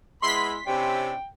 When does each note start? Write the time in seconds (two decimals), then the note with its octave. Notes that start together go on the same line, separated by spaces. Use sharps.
0.22 G#3 B3 E4 B5 C6 B6
0.67 C3 C#4 D4 E4 G5